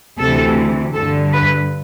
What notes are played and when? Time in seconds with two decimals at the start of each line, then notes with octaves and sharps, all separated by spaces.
0.20 D2 C3 E3 A4
0.95 G2 D3 A4
1.33 B4